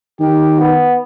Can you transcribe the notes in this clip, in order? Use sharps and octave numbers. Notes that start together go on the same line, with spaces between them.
D#3 G4
B3